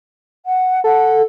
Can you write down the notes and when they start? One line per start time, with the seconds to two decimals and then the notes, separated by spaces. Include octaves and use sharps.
0.45 F#5
0.84 A4 F#5